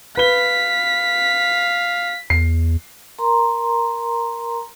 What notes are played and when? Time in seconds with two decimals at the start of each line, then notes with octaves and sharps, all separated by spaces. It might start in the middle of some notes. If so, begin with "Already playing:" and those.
0.17 B4 F5 B6 G7
2.30 E2 C7
3.19 A#4 A#5 C6